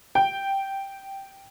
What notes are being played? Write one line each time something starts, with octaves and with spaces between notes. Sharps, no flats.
G5